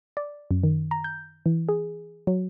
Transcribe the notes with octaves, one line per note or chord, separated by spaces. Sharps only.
D5
F#2
D#3
A#5
G6
E3
G#4
F#3